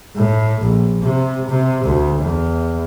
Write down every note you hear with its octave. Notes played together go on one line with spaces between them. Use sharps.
A2
A#1
C3
C3
D2
E2